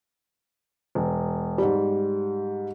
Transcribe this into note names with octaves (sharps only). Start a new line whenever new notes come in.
E1
G#2 G3